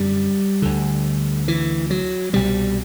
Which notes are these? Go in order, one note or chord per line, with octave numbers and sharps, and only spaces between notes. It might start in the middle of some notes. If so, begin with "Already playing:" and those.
Already playing: F#2 D3 G3
D2 D3
E3
F#3
C2 B2 G3